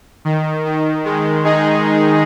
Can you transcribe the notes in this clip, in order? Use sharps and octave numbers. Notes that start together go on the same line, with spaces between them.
D#3
D#3
D#3 G#3
D#4 G#4